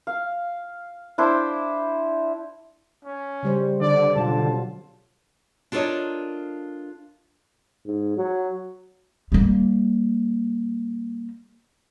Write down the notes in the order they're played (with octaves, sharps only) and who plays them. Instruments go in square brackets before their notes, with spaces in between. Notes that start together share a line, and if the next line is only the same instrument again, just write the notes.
[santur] F5
D4 E4 C5
[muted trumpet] C#4
[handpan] C#3 G3 C5
[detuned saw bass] D3 [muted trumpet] D5
[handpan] B2 F#3 F4 [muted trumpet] A5
[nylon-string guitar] D4 F4 A4 A#4 C#5 D#5
[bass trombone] G#2
F#3
[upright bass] G3 A#3